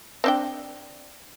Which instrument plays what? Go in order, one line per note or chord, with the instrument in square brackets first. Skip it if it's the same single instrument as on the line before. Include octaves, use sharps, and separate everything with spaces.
[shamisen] C4 D4 G5